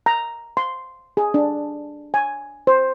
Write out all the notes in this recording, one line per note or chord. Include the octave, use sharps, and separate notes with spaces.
A#5
C6
G#4
D4
G#5
C5